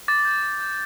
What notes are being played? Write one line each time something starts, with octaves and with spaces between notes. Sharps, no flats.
D6 A6
G6
D6
G6